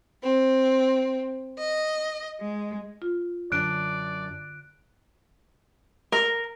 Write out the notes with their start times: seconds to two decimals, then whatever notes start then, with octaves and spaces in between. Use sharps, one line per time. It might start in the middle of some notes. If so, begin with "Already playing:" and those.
0.22 C4
1.58 D#5
2.40 G#3
3.02 F4
3.52 F#2 D3 D4 D5 F#6 D7
6.12 A#4